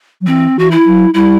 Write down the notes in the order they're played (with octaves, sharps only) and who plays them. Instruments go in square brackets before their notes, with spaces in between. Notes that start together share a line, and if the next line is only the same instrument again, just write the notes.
[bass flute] F#3
[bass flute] E3 [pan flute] C4
[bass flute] E3 [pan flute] F#4
[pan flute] E4
[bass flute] F#3
[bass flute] G3 [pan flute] E4